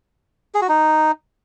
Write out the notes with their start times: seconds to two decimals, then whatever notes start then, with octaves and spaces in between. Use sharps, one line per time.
0.55 G#4
0.62 F#4
0.69 D#4